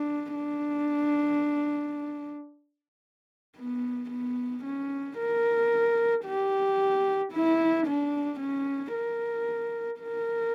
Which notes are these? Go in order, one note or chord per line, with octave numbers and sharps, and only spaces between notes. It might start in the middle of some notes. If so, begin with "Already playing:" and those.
Already playing: D4
D4
B3
B3
C#4
A#4
G4
E4
D4
C#4
A#4
A#4